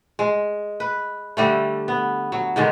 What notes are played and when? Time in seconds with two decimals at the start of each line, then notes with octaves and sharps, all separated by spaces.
0.19 G#3
0.80 B4
1.37 D3 G3 A3
1.88 B3
2.32 F#3
2.56 G#2 D3 D#3 G#3